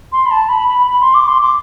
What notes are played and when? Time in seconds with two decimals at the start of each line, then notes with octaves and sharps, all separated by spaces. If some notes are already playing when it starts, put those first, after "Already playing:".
0.12 C6
0.26 B5
0.31 A5
0.49 B5
0.68 B5
0.87 B5
1.01 C6
1.14 D6
1.28 C6
1.41 D6